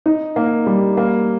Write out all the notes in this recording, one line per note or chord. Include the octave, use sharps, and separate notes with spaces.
D#4
A#3
G3
A#3